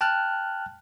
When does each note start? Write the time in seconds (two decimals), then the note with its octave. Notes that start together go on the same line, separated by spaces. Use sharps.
0.01 G5 A5 F6 F#6